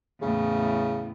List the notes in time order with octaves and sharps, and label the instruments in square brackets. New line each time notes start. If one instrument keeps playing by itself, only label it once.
[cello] E2 A2 [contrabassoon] C#3